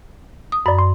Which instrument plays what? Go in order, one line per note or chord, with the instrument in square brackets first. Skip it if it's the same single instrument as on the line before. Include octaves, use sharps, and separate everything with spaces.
[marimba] D#6
[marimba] F#2 [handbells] D5 B5
[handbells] C6